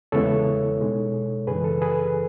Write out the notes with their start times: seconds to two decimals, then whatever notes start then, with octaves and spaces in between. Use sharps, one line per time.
0.12 E2 C#3 G#3 B3 E4 A4 C#5
0.79 B2 G#3 D#4
1.47 F#2 C#3 E3 G#4 B4
1.64 A4
1.82 G#4 B4